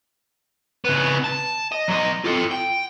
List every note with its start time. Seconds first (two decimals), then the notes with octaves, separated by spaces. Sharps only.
0.85 C#3 B3
1.24 A5
1.72 D#5
1.88 F#3 D#5
2.24 F4 A4
2.51 G5